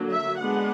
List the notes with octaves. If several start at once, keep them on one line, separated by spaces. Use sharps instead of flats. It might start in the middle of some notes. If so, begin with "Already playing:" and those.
Already playing: D3 F#3 A#3
E5
G#3 B3 D4 F#5